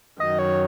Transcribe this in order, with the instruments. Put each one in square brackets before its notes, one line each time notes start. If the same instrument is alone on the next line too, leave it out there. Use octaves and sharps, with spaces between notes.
[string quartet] F#2 D#3 F#3 [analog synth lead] D#5
[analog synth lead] C#5